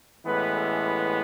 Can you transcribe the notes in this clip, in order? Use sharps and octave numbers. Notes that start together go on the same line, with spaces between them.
A1 A2 E3 G#3 B3 B4
A4
B4